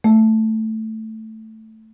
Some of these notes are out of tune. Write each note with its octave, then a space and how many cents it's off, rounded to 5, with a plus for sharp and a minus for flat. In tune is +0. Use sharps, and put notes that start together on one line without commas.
A3 +5